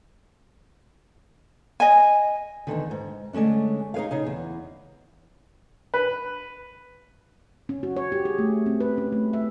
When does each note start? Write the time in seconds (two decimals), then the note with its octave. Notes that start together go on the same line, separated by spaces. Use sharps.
1.80 D#5 G#5
2.67 E2 G2 D3 D#3
2.91 G#2
3.33 D3 G#3 A3 C#4 D4
3.94 D#4 G#4 B4 C#5 F5
4.11 C#3 D#4 G#4
4.27 E2
5.94 B4
7.69 C#4
7.83 F#4
7.96 C#5
8.12 G4
8.25 G#4
8.39 A3
8.66 C4
8.81 B4
8.98 C#4
9.12 A3
9.33 E5